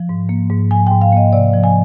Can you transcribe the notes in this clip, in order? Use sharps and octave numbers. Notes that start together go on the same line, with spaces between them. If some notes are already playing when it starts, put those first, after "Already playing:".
Already playing: F3
G#2
A#3
G#2
F3 G#5
G5
G#2
F5
A#3 D#5
C3 D5
F3
G#5